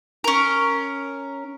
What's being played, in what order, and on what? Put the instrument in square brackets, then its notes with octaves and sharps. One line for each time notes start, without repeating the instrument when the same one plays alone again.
[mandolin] C#4 A#4